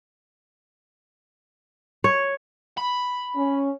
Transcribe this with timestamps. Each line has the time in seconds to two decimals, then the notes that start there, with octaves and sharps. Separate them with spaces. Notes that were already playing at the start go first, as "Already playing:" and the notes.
2.04 C#5
2.78 B5
3.36 C#4